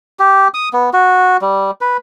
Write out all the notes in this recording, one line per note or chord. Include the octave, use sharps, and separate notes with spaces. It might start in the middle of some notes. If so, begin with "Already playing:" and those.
G4
D#6
B3
F#4
G3
B4